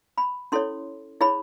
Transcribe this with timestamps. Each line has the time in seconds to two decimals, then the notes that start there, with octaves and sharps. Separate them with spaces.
0.18 B5
0.52 C#4 E4 A4 C#5 C6
1.21 E4 G#4 C#5 B5